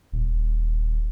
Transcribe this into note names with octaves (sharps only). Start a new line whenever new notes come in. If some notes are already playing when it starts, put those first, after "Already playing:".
D#1